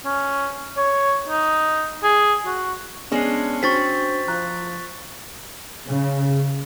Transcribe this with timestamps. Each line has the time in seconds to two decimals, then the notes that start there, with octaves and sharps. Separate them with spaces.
0.05 C#4
0.77 C#5
1.29 D#4
2.03 G#4
2.46 F#4
3.12 G#3 B3 C#4 D4 C7
3.63 C4 D4 F#4 C5 C#6 A6 B6
4.28 F3 A#5 F#6
5.87 C#3